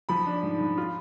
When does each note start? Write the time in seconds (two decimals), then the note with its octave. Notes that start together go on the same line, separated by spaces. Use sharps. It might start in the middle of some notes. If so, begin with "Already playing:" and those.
0.09 F3 B5
0.27 D4
0.43 G#2
0.60 G#2
0.78 F4